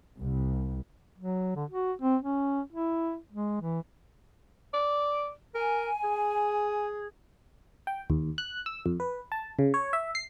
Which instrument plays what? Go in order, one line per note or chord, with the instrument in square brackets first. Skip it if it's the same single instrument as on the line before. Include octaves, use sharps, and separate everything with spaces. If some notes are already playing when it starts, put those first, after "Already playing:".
[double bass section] C2
[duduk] F#3
D3
F#4
C4
C#4
E4
G#3
E3
[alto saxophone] D5
[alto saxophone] A#4 [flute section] G#5
[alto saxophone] G#4
[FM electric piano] G5
D#2
F#6
E6
F2
B4
A5
C#3
C#5
E5
C7